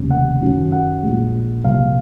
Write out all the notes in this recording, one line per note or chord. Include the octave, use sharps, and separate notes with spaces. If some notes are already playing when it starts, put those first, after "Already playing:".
Already playing: F1 D#2 C#3
F#5
F#2 D#3 F#3 C#4
F#5
A#1 A#2 G#3
C2 A#2 F3 F5